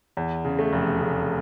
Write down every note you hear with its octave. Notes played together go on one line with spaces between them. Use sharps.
E2
C#3
A3
F1
C#3